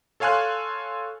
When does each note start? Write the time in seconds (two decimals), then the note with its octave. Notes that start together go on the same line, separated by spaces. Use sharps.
0.20 A4 C#5 F5 G#5 C6 F#6